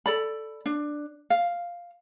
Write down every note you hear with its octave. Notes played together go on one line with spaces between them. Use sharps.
A4 D5 B5
D4
F5